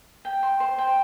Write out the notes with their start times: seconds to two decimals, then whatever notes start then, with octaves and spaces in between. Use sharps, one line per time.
0.25 G5
0.43 C6
0.60 C5
0.78 G5